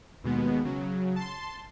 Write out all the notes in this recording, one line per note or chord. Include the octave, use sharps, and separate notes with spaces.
D#2 B2 G#3 B3
C#3 F#3
A5 C6